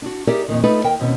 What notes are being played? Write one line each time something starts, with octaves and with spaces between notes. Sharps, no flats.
D4 F#4
D#4 G4 G#4 A#4 D5 E5
F2 A#2 D#3
A3 B3 D#4 F4 A4 B4
D#2 A#4 G5
D#2 B2 C4 C#4